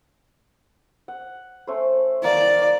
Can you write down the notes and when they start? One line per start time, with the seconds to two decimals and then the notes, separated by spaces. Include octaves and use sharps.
1.08 F#5
1.67 A3 C#4 C5
2.24 A#3 D5